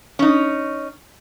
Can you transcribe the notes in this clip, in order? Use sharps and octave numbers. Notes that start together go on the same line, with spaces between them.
C#4 D#4